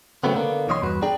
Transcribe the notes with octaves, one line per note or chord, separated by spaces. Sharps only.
C#3 F#3 A3 B3 C4
D3 A#3 B3
B1 E3 C#5 D#5 E5 C6
E2 G2 F#4 B4
D4 G#4 D5 G5 A#5